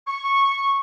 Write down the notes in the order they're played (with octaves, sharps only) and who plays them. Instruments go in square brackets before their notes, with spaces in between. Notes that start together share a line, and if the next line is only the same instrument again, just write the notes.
[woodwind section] C#6